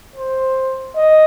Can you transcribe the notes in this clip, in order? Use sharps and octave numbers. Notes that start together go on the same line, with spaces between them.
C5
D#5